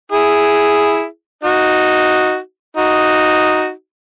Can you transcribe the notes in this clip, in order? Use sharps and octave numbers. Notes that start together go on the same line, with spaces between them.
E4 G#4
D#4 F#4
D#4 F#4